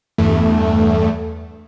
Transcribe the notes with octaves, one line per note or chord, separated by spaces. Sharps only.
E2 G2 A3